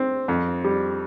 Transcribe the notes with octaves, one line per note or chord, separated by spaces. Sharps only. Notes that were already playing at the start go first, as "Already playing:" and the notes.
Already playing: C4
F2
G3